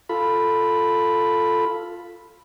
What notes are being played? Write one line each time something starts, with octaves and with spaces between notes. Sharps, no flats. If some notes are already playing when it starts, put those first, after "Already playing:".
F4 A4 B5